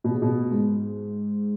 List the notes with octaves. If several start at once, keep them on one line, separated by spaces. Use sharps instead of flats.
B2
C#3
B2
G#2